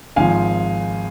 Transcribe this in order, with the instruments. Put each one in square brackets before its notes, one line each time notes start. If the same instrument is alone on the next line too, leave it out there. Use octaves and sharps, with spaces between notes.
[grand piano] G#1 G#2 F3 F5 G#5